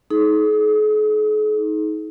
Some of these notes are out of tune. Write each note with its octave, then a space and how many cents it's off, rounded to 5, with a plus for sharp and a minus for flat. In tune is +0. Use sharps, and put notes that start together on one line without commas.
D#4 +25 G#4 +45